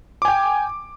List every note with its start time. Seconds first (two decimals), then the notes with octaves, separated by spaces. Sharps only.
0.22 D6
0.25 G#5
0.28 G5